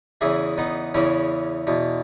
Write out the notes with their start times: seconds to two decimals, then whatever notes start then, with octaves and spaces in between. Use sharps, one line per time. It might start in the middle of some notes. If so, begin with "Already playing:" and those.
0.21 E2 C#3 E3 E4 G#4
0.58 B3 D#4
0.95 E2 C#3 E3 C#4 E4
1.67 E2 B2